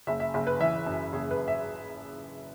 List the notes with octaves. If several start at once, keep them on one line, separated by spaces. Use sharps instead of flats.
F#1 E5
E5
F#1 E5
B4
E3 E5
F#2
F#1 G#4
B4
E5